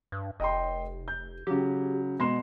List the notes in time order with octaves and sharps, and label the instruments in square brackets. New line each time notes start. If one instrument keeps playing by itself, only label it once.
[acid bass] G2
[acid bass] F1 [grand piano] D#5 G5 C6
[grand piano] G6
[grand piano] C#3 F#3 [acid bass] G4
[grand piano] B2 C6 E7 [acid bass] G#3